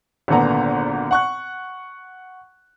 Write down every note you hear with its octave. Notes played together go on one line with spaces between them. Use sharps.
G#1 A#2 D3 B3 A#5
F#5 C#6 F#6